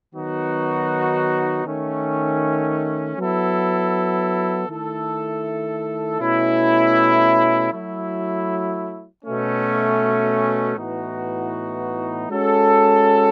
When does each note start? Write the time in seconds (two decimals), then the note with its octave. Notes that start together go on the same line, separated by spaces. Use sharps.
0.14 D#3 F#3 B3 D#4 F#4
1.65 D#3 A3 C#4
3.18 F#3 B3 E4 A4
4.69 D#3 A3 E4 A4
6.21 B2 A3 C#4 E4
7.73 F#3 A3 E4
9.24 B2 A3 C#4
10.76 A2 E3 B3 D#4 F#4
12.29 G#3 C#4 F#4 A4